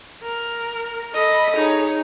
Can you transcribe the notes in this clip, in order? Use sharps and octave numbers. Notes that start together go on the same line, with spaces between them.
A#4
A4 D#5 B5
D#4 G#4 C#5